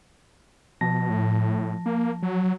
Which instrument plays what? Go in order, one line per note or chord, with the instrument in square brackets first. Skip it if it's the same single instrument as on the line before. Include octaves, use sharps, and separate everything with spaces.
[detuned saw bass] B2 [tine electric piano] F3 A5 A#6
[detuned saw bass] A2
A#3
F#3